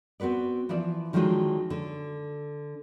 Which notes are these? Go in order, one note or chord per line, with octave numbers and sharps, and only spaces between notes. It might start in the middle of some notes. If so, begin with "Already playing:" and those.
B3 C4 F#4 B4 D5
E3 F3 E4 F4 D5
D3 D#3 F3 F#3 G#3 F4
D3